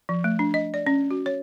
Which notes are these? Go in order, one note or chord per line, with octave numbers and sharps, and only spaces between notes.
F3
A3
D4
D#5
D5
C#4
F#4
C#5